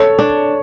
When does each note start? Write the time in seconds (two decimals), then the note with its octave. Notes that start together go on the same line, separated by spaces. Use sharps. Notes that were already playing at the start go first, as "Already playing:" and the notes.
Already playing: A4 C#5
0.19 D4